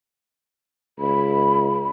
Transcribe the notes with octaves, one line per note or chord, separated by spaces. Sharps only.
C#2 B5